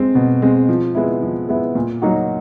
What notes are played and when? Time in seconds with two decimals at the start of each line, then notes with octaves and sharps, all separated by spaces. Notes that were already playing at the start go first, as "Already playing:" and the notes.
Already playing: G#3 C4
0.15 B2
0.42 G#3 C4
0.69 F3
0.95 G#3 B3 E4
1.22 F3
1.49 G#3 B3 E4
1.75 A#2
2.02 F#3 A#3 D#4 F#4